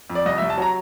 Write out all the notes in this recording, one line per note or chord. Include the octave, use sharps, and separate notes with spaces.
F2
D5
C2 D#5
C2 E5
A5
F#3 A#5